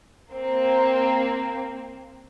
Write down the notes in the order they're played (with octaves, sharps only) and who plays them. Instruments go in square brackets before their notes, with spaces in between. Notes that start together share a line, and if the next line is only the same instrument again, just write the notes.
[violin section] A#3 C4